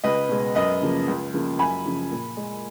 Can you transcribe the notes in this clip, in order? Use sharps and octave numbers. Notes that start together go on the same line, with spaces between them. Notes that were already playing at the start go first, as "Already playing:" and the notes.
C#2 B4 D#5
B2 G#3
F#2 B4 D#5
C#3 F3 A#3
C#2
C#3 F3 A#3
F#2 G#5 B5
C#3 F3
A#2
G#3